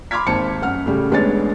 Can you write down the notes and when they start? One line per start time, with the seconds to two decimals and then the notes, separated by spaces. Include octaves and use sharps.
0.11 B5 C6 D6 F6 G#6 B6
0.27 G#1 D#2 C5 A5 C#7
0.62 F#2 F#5 F6
0.86 A2 C#3 G3
1.11 A1 G#3 B3 D4 C#5 A6